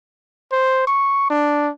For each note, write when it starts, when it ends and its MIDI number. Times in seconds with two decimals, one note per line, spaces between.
0.52 0.85 72
0.87 1.29 85
1.30 1.70 62